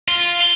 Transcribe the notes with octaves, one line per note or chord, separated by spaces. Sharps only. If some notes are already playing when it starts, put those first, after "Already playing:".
F4